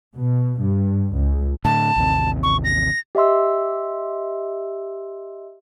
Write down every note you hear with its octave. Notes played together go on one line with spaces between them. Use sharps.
B2
G2
C#2
A2 D3 A5
A1 D#2 C3
C#6
A#6
G4 D#5 E5 C6 E6